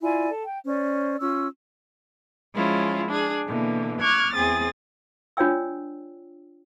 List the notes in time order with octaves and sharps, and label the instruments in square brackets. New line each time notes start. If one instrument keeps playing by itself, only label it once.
[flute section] E4 F4 D5 G#5
A4
G5
C#4 C5 D5
C#4 F4 E6
[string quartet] F3 G#3 C#4 E4 F4
D4 G#4
B2 D3 E3 A#3
C#6 D6 F6 F#6 G#6
E2 C4 G#4 G#5 D#6 A6
[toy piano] D4 F4 C#5 D5 G5 E6